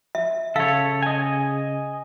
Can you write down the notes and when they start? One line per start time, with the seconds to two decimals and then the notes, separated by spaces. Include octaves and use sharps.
0.15 E5
0.56 C#3 A4 C#5 F5
1.03 D#5 G#5